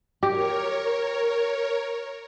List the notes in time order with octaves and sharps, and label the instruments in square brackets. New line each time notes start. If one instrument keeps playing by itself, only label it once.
[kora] G4 [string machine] A#4 C#5